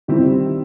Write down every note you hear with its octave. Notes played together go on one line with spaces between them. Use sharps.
D#3 G3 C4 E4